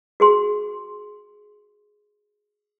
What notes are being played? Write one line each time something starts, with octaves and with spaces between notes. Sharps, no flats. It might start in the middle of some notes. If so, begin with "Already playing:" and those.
F#4 G#4 C6